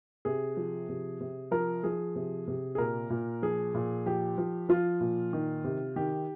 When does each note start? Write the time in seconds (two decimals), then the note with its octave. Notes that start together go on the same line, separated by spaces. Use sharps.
0.25 C3 G#4
0.57 F3
0.89 C3
1.21 C3
1.51 F3 A#4
1.83 F3 G#4
2.16 C3
2.48 C3
2.75 G#4
2.78 A#2 A#4
3.10 A#2
3.42 F3 G#4
3.74 A#2
4.06 F3 G4
4.38 F3
4.69 F3 F4
5.00 A#2
5.33 D#3
5.64 C3
5.96 D#3 G4